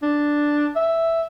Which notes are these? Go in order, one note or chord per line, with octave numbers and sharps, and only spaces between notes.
D4
E5